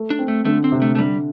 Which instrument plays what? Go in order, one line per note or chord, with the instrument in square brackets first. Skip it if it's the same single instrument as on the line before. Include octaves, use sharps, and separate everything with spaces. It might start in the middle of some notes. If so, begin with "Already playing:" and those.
Already playing: [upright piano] A3
[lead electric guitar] D4
[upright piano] C4
[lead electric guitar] A3
[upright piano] D3 [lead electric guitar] A3
[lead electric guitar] C4
[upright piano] C3
[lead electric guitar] A3
A3
[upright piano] D3 [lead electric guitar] G3